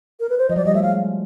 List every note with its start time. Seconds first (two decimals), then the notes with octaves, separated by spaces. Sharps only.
0.20 A#4
0.29 B4
0.38 C5
0.50 F3 D#5
0.56 F#3 D5
0.65 G3 D#5
0.74 A3 E5
0.82 G#3 F5